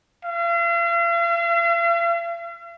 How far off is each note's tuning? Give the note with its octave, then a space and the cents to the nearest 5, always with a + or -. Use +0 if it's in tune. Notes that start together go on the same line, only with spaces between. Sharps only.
F5 -45